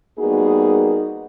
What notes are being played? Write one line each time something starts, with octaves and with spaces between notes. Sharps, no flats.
G3 A#3 B3 D#4 F#4 G#4